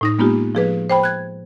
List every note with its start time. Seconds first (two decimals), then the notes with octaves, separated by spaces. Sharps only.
0.01 A2 D#4 A#6
0.19 G#3 A#3 B3 D#4 F4 G4
0.55 F3 G#4 B4
0.90 C5 G5 B5
1.03 F#6 G#6